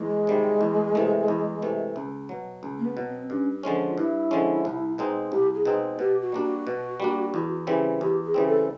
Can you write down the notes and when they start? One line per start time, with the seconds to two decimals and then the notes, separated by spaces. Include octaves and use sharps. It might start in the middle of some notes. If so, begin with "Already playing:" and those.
Already playing: E2 G#3
0.27 C3 D#3 G3
0.61 E2
0.95 C3 E3 A3
1.28 E2
1.62 C3 E3 A3
1.96 C#2
2.29 B2 F#3
2.63 C#2
2.78 A#3
2.85 B3
2.97 B2 F#3
3.07 C4
3.30 G2 C#4
3.63 D3 F3 G#3 C#4
3.75 F4
3.97 G2 E4
4.31 D3 F3 G#3 C#4
4.65 C2
4.98 B2 G#3 C4 D#4
5.31 C2 G4
5.54 G#4
5.65 B2 G#3 C4 D#4
5.99 B2 G4
6.21 F#4
6.32 G3 A#3 D4
6.44 F#4
6.67 B2
7.00 G3 A#3 D4
7.34 E2
7.67 C#3 E3 G3 C4
8.00 E2 G4
8.23 G#4
8.34 C#3 E3 G3 C4
8.46 A4